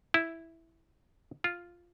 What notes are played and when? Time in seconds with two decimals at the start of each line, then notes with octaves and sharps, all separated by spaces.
0.14 E4
1.44 F4